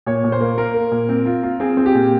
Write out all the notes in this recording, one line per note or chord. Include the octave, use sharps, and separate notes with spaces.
A#2 C#5
A#2
C5
A#3
A#3 A#4
A#3
A#2
C4
F4
F4
C4 G#4
C4
G4
A#2